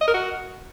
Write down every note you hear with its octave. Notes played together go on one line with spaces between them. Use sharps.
D#5
A#4
F#4